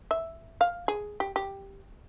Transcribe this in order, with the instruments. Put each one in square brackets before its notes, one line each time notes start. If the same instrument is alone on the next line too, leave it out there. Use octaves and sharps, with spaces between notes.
[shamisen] E5
F5
G#4
G4
G4